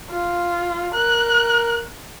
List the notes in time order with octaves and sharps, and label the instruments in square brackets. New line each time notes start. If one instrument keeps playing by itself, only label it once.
[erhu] F4
[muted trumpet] A#4 [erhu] F#6